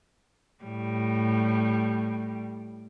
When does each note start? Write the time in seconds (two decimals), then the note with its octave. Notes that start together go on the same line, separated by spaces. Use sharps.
0.64 A2 G3